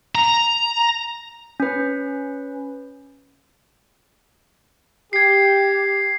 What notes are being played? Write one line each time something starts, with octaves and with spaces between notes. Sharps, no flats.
A#5
C#4 B4
G4 G#6 C7